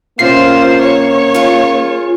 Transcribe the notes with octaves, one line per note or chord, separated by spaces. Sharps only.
C3 A#3 C#4 F4 C5 C7
C#5
F4 G#4